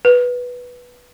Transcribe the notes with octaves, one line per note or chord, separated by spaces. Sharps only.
B4